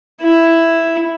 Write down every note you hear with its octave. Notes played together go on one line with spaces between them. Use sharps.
E4